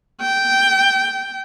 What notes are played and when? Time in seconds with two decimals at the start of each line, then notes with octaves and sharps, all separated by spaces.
0.21 G5